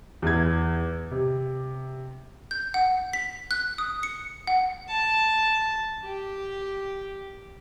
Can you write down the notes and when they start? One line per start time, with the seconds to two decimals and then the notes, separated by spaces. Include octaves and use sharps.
0.22 E2 G#6
1.11 C3
2.51 G6
2.74 F#5
3.13 B6
3.51 F#6
3.78 D#6
4.03 C#7
4.47 F#5
4.88 A5
6.04 G4